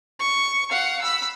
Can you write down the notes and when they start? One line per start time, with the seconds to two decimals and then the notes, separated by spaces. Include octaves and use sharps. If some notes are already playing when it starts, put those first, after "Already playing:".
0.20 C#6
0.69 F5 F#5
1.02 B5 E6